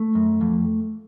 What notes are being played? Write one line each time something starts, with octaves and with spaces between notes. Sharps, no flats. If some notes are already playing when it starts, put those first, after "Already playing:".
Already playing: A3
F#2
F2